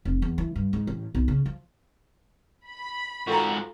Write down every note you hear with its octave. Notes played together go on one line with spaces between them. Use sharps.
F1
E2
E3
G2
G#2
A1
B1
C#3
F3
B5
G#2 F4 F#4 A4 A#5